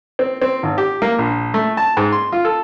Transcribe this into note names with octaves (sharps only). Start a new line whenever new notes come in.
C4
C4
G#1
G4
A#3
A#1
A3
A5
G#2
C6
F4
A4